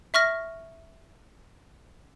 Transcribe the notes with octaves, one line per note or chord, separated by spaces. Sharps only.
E5 C#6 F6 A#6